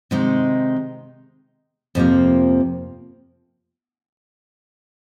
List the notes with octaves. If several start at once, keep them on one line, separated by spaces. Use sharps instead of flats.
C3 D#3 G#3 D#4
F2 C3 F3 A#3